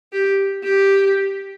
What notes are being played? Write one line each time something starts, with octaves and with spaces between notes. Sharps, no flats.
G4
G4